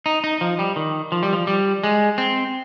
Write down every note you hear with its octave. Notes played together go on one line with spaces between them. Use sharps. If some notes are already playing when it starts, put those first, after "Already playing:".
D#4
D#4
F3
G3
D#3
F3
G3
F3
G3
G#3
C4